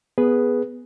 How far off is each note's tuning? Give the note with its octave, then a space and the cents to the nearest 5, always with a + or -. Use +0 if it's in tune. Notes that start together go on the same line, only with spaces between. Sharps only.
B3 +0 G#4 +0 B4 +0